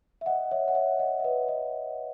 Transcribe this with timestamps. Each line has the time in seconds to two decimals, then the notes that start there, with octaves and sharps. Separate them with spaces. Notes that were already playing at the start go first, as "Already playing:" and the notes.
0.21 E5
0.26 D#5 F#5
0.51 C#5 E5
0.68 F#5
0.75 C#5 E5
0.99 D#5 F#5
1.20 E5
1.24 B4 D#5
1.48 D#5 F#5